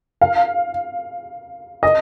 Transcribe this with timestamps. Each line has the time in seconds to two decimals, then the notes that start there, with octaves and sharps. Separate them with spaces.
0.21 F5
1.83 D#5